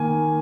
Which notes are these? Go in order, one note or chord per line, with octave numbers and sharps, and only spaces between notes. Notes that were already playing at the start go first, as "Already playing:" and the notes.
Already playing: D#3 A#3 G#5